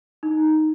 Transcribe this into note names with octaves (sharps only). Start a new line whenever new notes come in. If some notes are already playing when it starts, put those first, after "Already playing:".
D#4